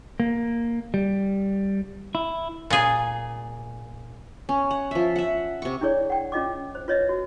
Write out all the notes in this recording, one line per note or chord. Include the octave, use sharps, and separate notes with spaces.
A#3
G3
E4
A#2 G#4
C#4
F#5
F3 E5
E5 F#5
C3 C#6
D4 E4 G#4 C#5 D5
F#5 G5
C#4 F4 D#5 D6
C5
F4 B4 C#5 D#5 E5
F#4